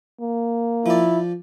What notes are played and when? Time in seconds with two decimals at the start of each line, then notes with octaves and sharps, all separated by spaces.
0.21 A#3
0.86 F3 E4 D5